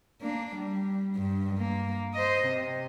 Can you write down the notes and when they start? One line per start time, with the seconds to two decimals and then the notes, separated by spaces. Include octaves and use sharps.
0.22 A#3 D4
0.56 G3
1.16 G2
1.58 A#3
2.14 C5 D#5
2.46 C3